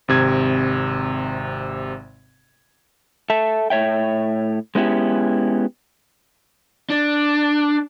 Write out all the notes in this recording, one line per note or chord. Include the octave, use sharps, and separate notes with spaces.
G#1 C3 G#6
A4 E5 A5
A2 C#5 E5 G5
G#3 B3 C#4 E4 G4
D4